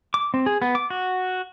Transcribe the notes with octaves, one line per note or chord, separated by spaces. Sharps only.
D6
C4
G#4
B3
D6
F#4